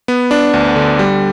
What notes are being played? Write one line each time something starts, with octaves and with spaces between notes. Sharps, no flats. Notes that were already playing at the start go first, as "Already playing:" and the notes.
B3
D4
D2
D3
G3